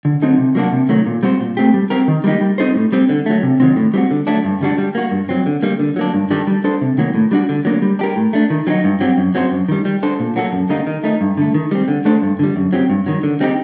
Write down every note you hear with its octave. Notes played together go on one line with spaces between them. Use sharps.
D3
F#3 C4 D#4 A4
C3
F#3 A#3 D4 F#4
C3
D#3 F#3 A3
A#2
G3 C4 F#4 C5
A#2
A3 C4 G4
G3
C4 G4 A#4
D#3
G3 A#3 D#4 G4
G3
C4 D#4 A4 C5
A2
G3 C4
D3
F#3 A3
C3
D#3 F#3 C4
A2
G3 C4 F#4
D3
F#3 A3 D4
G2
D3 G3 D4 F#4
G3
A#3 F#4
G2
F#3 C4
D3
G3 A#3
D3
F#3 A#3 D4
G2
D#3 G3 D4 A4
G3
D4 A4 C5
C3
D#3 F#3 A#3
A2
G3 D4 F#4
D3
F#3 A#3 D4
G3
D4 G4 A#4
A2
A3 D4
D#3
F#3 C4 D#4 F#4
G2
F#3 C4 G4
F#2
F#3 C4 F#4 C5
F#2
D#3 G3
G3
D4 A4 C5
A#2
F#3 A#3 F#4 A4
F#2
D3 G3 A#3 D#4
D#3
A3 D#4
G2
D3 A3
D#3
G3 C4
D3
A3 D4 A4 C5
G2
D3 G3
F#2
F#3 C4 G4
G2
D#3 F#3
D3
G3 C4 D#4 G4